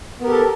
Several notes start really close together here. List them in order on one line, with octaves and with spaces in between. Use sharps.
B3 A#4 G4 A4